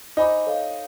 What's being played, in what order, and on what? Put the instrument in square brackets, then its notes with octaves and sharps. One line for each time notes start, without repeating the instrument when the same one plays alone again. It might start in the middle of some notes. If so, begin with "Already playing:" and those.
[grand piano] D#4 [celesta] C5 D#5 G#5 B5 D6
[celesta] A4 C#5 F5